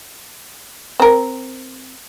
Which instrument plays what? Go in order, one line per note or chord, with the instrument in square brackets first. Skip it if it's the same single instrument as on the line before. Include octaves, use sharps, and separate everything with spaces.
[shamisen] C4 A#4